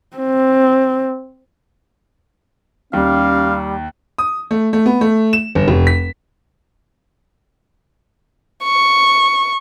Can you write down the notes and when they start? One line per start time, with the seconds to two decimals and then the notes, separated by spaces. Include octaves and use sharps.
0.17 C4
2.93 D#2 G3 C#4 F5
4.18 D#6
4.51 A3
4.73 A3
4.86 B3
5.01 A3
5.33 E7
5.55 G1
5.68 F1
5.87 B6
8.65 C#6